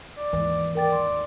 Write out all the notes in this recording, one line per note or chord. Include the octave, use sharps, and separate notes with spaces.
D5
D#2 G#2 E3
A#4 D5 G5 A6
C6